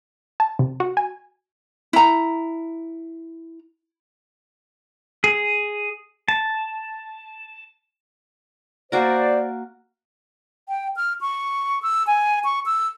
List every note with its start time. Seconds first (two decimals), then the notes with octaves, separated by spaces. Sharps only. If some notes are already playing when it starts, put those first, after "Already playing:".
0.40 A5
0.59 C3
0.80 F#4
0.97 G#5
1.93 E4 A#5
5.24 G#4
6.28 A5
8.92 A#3 F#4 A#4 C5 D5
10.69 G5
10.97 F6
11.21 C#6
11.82 E6
12.07 G#5
12.45 C#6
12.66 E6